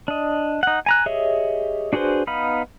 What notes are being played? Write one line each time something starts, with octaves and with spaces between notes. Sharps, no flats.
D4 D#5
D#4 F#5
G#5 A#5 F#6
G4 G#4 C#5 D#5 E5
D4 F#4 G#4 B4 C5
B3 D#4 F5 B5